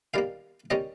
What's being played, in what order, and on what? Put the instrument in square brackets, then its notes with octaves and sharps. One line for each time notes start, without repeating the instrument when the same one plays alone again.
[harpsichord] D#3 G3 A#3 F5
D#3 G3 C#4 D#5